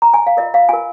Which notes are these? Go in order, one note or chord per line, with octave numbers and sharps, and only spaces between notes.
A#5
G#5
F5
F4 A#4 D#5
F5
F4 A#4 G#5